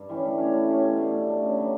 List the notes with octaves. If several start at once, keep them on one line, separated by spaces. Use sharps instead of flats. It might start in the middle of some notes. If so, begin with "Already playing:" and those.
Already playing: G2
E3 G3 C#4
A3
C#4 G4 C#5
A3
C#4 G4 C#5
B2
A3 D4
B2
A3 D4
C#3
F#3 B3 D4